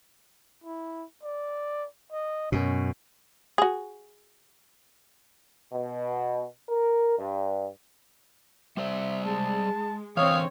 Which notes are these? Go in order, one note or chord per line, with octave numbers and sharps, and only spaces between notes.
E4
D5
D#5
F#2 B2 C#4
F#4 G#4
B2
A#4
G2
G3 C5 D5 E5
G#3 A5
D3 E3 C4 C#5 F5 D#6